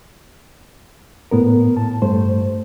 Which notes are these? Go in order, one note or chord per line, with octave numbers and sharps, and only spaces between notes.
A2 B3 A#4
A2 A5
G2 A3 C5